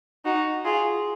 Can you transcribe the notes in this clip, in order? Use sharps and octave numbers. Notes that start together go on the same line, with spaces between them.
D#4 F#4
F4 G#4